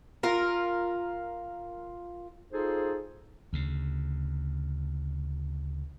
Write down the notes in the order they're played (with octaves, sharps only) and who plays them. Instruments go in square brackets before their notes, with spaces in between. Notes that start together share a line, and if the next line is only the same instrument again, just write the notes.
[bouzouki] F4 A#4
[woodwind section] D#4 F4 G#4 A4 C5
[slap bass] D2 C#3